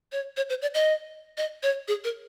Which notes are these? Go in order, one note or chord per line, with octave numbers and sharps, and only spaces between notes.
C#5
C#5
C5
D5
D#5
D#5
C#5
G#4
A#4